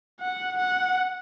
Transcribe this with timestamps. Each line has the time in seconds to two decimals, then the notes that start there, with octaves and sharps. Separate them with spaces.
0.21 F#5
0.59 F#5